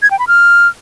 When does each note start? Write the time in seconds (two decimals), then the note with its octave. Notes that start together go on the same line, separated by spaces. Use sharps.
0.02 G#6
0.11 G5
0.19 B5
0.28 F6